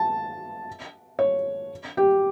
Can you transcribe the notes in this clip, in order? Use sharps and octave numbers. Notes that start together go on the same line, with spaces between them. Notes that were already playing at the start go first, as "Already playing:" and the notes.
Already playing: A5
C#5
G4